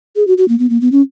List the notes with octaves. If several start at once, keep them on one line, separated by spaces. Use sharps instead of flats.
G#4
F#4
F#4
A#3
B3
A#3
B3
C#4